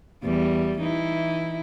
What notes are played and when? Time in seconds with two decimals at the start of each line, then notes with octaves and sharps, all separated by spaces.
0.24 E2 G3
0.81 E3 D#4 E4